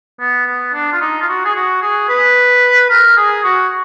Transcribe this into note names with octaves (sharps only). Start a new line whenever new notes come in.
B3
B3
D4
F4
D#4
F4
F#4
G#4
F#4
G#4
B4
A#4
G#4
F#4